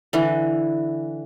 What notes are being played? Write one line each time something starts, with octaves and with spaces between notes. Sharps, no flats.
D3 E3